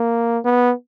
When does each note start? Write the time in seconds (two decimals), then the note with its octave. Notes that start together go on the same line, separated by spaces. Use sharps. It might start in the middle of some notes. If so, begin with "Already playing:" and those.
Already playing: A#3
0.44 B3